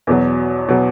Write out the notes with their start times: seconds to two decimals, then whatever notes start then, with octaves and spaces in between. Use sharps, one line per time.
0.07 E2 B2 F#3
0.68 B2 F#3